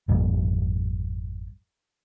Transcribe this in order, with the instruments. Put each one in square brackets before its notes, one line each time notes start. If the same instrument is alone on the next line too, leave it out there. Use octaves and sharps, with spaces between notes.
[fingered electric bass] G#1 F2 A#2 G3